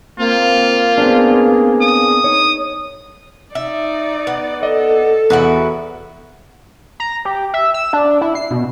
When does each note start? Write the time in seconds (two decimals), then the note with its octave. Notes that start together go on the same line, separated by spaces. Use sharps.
0.20 A#3 C4 F4
0.98 B3 C4 D4 G#4
1.81 D#6
2.24 D#4 C#5
3.55 D#4 D5 E5
4.27 B3
4.63 A4 D5 D#5
5.30 E2 E4 F#4 B4
7.00 A#5
7.25 G4
7.54 E5
7.74 E6
7.93 D4
8.21 E4
8.35 C7
8.51 B2